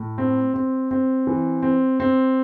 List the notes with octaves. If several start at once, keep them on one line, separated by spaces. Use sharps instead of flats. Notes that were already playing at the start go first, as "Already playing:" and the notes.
Already playing: A2
C4
C4
C4
E3
C4
C4